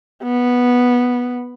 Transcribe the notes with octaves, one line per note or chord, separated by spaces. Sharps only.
B3